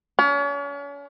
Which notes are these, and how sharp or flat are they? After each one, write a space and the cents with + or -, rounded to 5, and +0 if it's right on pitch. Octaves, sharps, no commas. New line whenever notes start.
C#4 +40